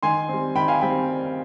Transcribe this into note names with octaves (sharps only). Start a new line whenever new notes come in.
D#3 G#5 C6
G3 C4
D#3 G5 B5
F5 G#5
G3 C4 G5 B5